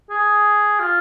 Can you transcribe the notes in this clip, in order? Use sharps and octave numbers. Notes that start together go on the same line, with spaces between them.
G#4
F4